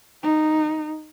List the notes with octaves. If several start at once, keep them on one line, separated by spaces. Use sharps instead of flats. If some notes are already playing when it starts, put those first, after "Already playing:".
D#4